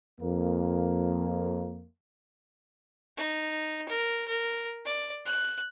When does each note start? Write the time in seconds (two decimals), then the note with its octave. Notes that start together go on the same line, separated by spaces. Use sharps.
0.21 F2 A#3
3.17 D#4
3.88 A#4
4.28 A#4
4.85 D5
5.26 F#6